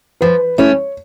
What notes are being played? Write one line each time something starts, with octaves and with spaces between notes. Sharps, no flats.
F3 B4
A3 C#4 E4 C#5